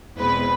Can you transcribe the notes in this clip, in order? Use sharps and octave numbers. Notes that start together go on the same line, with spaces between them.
E2 B2 G#3 C4 B4